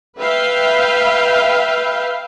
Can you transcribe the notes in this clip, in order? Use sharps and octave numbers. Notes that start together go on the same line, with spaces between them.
B4 E5 F5 G5